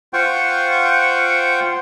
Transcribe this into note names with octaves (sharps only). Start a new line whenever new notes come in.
F4 C5 F#5 G5 C#6